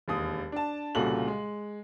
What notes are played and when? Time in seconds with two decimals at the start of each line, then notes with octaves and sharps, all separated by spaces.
0.08 E1 D#2 D#6
0.52 D4 A5
0.95 C2 A#2 C#3 F#4 A4 F#7
1.28 G#3